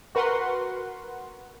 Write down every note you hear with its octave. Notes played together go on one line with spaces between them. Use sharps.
F#4 A#4 B4 F#5 C6